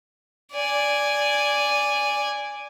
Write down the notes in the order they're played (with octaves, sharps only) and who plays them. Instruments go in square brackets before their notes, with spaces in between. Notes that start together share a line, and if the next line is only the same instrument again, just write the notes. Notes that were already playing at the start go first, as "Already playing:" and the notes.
[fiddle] D5 G#5